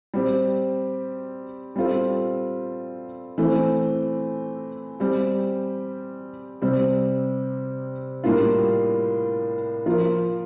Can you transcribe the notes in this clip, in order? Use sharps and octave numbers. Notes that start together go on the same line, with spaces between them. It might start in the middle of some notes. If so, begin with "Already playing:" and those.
G3 C4 G4
G3 C4 F4 A4
E3 A3 C4
G3 C4 G4
C3 G3 C4 G4
A2 G3 A#3 D4 F4
F3 A#3 F4 A#4